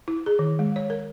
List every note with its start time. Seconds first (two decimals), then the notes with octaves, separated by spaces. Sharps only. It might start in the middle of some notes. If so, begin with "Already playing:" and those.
0.08 E4
0.26 G#4
0.39 D#3
0.59 G#3
0.76 C#5
0.90 A#4